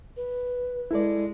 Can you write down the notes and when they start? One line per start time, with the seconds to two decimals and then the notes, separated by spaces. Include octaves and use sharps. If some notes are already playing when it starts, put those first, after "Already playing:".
0.17 B4
0.91 G#3 E4 A4 D5